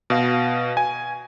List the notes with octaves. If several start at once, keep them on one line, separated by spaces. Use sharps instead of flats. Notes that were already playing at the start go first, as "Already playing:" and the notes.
B2 F5
G#5